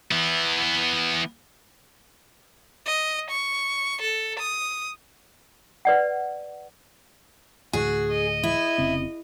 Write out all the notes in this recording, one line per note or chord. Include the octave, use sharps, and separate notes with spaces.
E3 B3
D#5
C#6
A4
D#6
B4 D5 F#5
D2 A2 F#4 G#4
D#5
E4
F1 C#3 C4